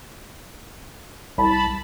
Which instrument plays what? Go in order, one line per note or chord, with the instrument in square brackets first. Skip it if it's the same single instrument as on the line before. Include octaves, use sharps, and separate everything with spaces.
[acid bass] C2 [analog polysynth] A5 B5